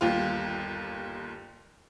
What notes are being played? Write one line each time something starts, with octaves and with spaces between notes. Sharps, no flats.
G1 D#2 F4